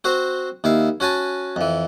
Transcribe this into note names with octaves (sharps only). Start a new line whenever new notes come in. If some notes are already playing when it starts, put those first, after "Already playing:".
C4 F#4 C5
D#2 E4 F5
C#4 F#4 G#5 A5
F2 E3